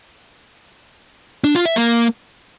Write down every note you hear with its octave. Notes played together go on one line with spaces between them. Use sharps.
D4
F4
E5
A#3